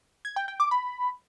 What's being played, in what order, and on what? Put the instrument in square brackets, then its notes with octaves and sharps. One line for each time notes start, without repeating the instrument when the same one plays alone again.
[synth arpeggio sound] G#6
G5
G5
D6
B5